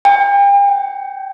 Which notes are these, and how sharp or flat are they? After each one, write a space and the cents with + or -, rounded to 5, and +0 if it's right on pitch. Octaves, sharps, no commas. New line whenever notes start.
G5 +40
G5 -30